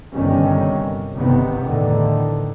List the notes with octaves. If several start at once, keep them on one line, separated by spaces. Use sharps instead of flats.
G1 G2 C3 D#3 G3 C#4
G1 G2 C3 D#3 B3
E2 A2 D3 D#3